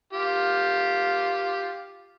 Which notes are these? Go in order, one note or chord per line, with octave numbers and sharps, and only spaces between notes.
F4 G4